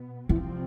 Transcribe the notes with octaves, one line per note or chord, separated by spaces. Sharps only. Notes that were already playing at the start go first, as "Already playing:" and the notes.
Already playing: B2 B3
C2 C3 E3 F3 C4